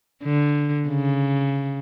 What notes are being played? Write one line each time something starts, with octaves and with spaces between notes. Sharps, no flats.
D3
C#3